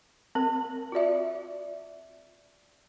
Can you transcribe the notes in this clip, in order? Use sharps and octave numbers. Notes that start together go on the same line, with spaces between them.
C4 A#4
F4 F#4 D5 E5